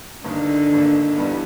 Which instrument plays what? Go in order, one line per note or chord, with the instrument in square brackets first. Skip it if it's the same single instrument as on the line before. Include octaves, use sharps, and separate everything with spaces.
[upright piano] G1 G2 D#3 [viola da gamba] D3
[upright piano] G1 G2 D#3
G2 E3 G3 B3